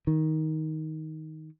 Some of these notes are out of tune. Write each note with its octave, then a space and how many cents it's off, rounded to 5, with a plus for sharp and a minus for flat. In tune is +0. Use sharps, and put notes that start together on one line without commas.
D#3 +10